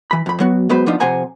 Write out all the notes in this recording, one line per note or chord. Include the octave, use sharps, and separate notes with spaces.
E3 B5
F2 B5
F#3 B3 F#4
F#3 G#3 B3 B4 C5
F3 B3 D4 D#4 F4
F2 C3 C5 F#5 G#5 A#5